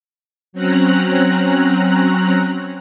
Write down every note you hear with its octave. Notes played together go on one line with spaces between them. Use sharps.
F#3 C4 C#4 A#5 F#6